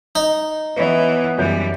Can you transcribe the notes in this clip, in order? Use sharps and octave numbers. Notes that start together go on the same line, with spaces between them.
D#4
E3 B3 B4 C#5 D#5
F#2 E3 G3 G6